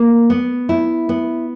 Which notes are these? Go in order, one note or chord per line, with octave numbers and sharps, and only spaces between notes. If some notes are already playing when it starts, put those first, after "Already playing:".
Already playing: A#3
B3
E4
B3